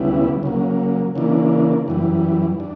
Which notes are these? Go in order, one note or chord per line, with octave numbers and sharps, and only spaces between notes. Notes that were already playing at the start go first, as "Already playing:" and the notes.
Already playing: D2 C#3 G3 B3 E4
C#3 F#3 A#3
C#3 E3 A#3 D4
F#2 E3 G3
D4